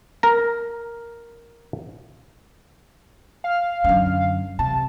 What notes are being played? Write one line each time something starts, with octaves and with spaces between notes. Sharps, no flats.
A#4 A#5
F5
F#2 D3
C3 A5